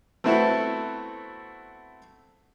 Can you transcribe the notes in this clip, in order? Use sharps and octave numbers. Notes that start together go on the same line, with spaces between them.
A3 B3 C4 E4 F#4 A4